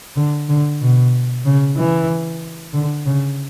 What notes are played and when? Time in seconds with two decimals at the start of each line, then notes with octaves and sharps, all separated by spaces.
0.16 D3
0.49 D3
0.81 B2
1.45 C#3
1.77 E3
2.74 D3
3.06 C#3